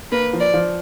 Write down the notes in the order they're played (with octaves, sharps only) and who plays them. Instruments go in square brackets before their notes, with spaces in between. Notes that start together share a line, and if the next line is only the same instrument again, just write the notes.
[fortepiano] A#3 [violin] B4
[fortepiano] F3
[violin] D5
[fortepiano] F3